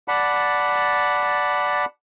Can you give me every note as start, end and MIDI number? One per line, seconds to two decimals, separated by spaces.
0.08 1.85 74
0.08 1.85 78
0.08 1.85 81
0.08 1.85 83